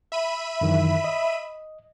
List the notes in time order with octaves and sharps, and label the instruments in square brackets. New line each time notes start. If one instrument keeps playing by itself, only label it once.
[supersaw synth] E5 B5 D#7
[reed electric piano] F#2 D#3 E3
D#5